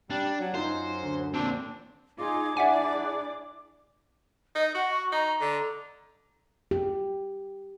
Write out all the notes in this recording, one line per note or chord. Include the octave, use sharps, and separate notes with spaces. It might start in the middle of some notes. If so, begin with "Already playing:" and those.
G3 D4
F#3
F#2 D#4 F4 C5
D2
A#2 C4 D4
D#4 F4 G#4 D6
D4 E4 G#4 D5 E5 F#5 G#5
D#4 D#5
F#4 F#5
C#6
D#4 A#5
D3
G4